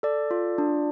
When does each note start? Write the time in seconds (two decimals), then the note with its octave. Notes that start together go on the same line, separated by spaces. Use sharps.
0.03 A4 D5
0.31 F4
0.58 D4